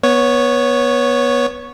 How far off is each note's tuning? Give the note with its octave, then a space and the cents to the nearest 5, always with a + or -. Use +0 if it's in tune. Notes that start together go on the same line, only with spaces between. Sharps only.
B3 -15 C#5 +0